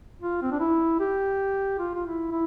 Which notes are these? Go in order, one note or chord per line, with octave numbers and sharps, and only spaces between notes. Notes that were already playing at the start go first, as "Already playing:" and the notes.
F4
C4
D4
E4
G4
F4
F4
E4
E4